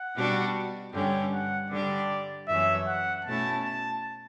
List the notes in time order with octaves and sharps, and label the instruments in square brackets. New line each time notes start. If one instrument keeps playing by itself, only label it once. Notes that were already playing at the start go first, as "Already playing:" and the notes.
Already playing: [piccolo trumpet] F#5
[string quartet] B2 G3 D4 F#4
[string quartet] G2 D3 G3 C#4 [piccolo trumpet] G5
[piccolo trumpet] F#5
[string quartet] D3 G3 D4 G4 [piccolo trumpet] D5
[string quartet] F#2 E3 A3 C#4 [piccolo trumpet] E5
[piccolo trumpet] F#5
[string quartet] B2 A3 C#4 E4 [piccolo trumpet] A5
[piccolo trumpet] A5